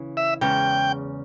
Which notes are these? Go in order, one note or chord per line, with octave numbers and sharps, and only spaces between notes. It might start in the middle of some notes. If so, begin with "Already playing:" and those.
Already playing: C#3 E3
E5
E2 C#3 G#3 G5